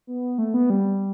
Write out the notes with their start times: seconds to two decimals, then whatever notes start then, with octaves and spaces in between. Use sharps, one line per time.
0.07 B3
0.38 A3
0.54 B3
0.70 G3